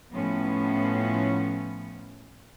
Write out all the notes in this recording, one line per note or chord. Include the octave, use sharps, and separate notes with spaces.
A2 F3 B3 C#4